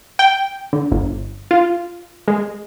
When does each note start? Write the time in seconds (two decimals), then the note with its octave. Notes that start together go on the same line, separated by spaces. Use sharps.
0.19 G5
0.73 D3
0.92 G1
1.51 F4
2.28 G#3